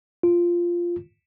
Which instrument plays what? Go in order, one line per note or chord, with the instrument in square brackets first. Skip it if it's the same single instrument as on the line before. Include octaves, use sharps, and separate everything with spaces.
[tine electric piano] F4